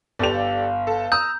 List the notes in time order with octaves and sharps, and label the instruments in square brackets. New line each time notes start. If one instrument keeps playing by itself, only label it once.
[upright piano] G1 F7 [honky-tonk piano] G4 A4 D5
[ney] F5
[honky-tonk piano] A4
[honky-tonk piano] A#5 E6 [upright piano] D#6 [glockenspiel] G6